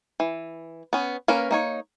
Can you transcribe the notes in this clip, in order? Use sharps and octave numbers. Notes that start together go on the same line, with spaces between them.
E3
B3 C#4
A#3 C#4 A#4 B4
A#3 D#4 C#5